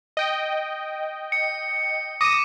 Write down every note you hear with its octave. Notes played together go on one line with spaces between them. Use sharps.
D#5 G5
C#7
D6 D#6 A#6 D#7